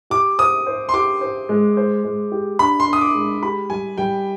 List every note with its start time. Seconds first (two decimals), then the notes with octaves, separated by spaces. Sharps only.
0.10 G4 D6
0.38 C5 D#6
0.67 C5
0.89 C6
0.94 G4 D6
1.21 C5
1.49 G#3
1.77 C5
2.04 G#3
2.32 G4
2.59 D4 B5
2.80 C6
2.87 D4
2.93 D#6
3.01 D6
3.15 G#3
3.42 G4 B5
3.70 G3 G#5
3.98 G3 G5